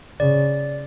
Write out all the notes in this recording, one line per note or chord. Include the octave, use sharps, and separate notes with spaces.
C#3 D5